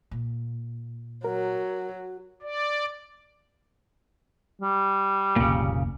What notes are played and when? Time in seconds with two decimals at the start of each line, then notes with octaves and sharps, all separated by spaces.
0.11 A#2
1.24 F#3 F#4 A#4
2.43 D5
4.62 G3
5.36 F1 C2 A#2 C#3 A#3